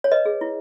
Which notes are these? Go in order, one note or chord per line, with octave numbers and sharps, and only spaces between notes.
C#5
B4 D#5
G#4
E4